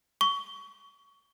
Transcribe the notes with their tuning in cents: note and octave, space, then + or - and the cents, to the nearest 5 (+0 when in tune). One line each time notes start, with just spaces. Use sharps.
C#6 +25